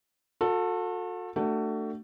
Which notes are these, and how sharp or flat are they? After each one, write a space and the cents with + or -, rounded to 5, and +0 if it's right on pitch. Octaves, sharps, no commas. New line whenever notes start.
F#4 -40 A4 +15
A3 +20 D4 +20 F#4 +30